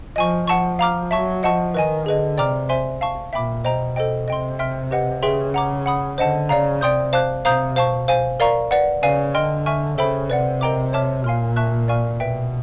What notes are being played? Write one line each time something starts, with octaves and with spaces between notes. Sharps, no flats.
F3 D#5 G#5 C#6
F3 F#5 A5 C#6
F5 A#5 D6 F6
F#3 E5 A5 C#6
F3 D#5 F#5 A5 C#6
D#3 B4 D#5 G#5
D3 G#4 B4 D#5
C3 D5 G5 A#5 D6 F6
C5 E5 G#5 C6
F5 A5 C#6
A#2 E5 G5 B5 D6
B2 C5 D#5 G5 A#5
A4 C5 D#5 G5
C3 D#5 G5 C6
E5 G5 C6 F6
G4 B4 D#5 F#5
C#3 G#4 B4 E5 G5 C6
F#5 A#5 D6
F#5 B5 D#6
D3 C5 D#5 F#5 A5
C#3 D5 F5 A#5
C3 D5 G5 C6 D#6 G6
C5 F5 A5 D6 F#6
C3 C5 F5 A#5 D#6 G6
B2 C5 F5 A5 C#6
C5 F5 G#5
A#4 D5 F5 A#5 C#6
B4 D5 F#5
C#3 B4 D5 F5 G#5
D3 D#5 G5 C6 F6
E5 G#5 C#6 F6
C#3 A4 C5 E5 G5 B5
C3 B4 D5 F#5
A#4 D#5 G5 A#5 D6
C#5 E5 A5 D6 F6
A#2 F5 G#5 C6 F6
E5 A5 C#6 F#6
D5 F5 G#5 C#6 F6
B2 B4 E5 G5